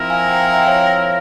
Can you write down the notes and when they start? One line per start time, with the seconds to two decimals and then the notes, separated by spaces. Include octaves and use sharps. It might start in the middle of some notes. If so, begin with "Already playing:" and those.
Already playing: F3 C4 E4 A#4
0.10 F5 G#5
0.28 G5 A#5
0.40 F5 G#5
0.54 E5 G5
0.67 C#5 F5